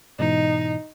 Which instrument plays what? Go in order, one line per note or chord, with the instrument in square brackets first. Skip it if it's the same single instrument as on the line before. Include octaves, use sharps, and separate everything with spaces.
[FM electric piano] G#2 B2 E3 [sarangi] D#4